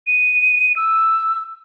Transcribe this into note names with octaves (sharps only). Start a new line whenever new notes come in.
D#7
E6